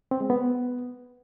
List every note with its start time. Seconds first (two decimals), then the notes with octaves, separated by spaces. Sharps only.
0.11 C4
0.21 G#3
0.30 B3